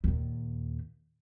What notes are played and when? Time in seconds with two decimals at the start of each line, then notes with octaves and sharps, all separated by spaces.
0.04 D#2 A#2